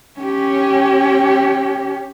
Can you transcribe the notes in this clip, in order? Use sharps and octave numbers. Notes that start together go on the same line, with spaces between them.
C#4 G4